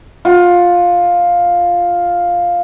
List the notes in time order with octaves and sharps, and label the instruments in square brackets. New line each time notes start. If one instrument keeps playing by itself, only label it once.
[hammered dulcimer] F4 F#5